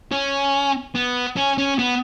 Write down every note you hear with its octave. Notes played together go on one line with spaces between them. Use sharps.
C#4
B3
C#4
C#4
B3